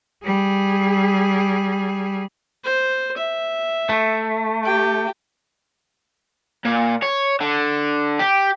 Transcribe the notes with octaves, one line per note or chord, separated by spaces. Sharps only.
G3 G#4
C5
E5
A3
G4 G5
A#2
C#5
D3
G4